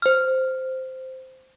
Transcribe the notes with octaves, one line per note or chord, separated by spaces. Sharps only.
C5 F6